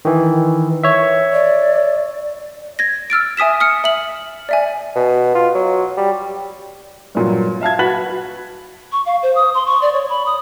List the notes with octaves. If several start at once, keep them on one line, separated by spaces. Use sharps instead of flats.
D#3 E3
C#5 E5
D5
G#6 A#6
E6 F6 A6 D7
E5 G#5 D#6 B6 E7
D#6 F6 C#7
E5 F#7
D5 E5 G#5
B2
F4
F#3
G3
G2 A#2 F#3
E5 F5 A5 G#6
F#4 B4 F#6 A6 B6 F#7
C#6
F5
C5
D#6
C6
C#6
D5
C#5
B5
D#6